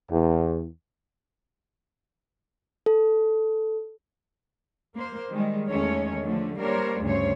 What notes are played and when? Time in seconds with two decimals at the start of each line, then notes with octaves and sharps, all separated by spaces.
0.10 E2
2.86 A4
4.96 A#3 C5
5.33 D#3 G3 G#3
5.68 E2 D#3 G#3 A3 C#4 C#5
6.24 D3 F3 A3
6.58 G3 A#3 D4 A#4 C5 C#5
7.03 D2 G2 C#3 A3 C5 C#5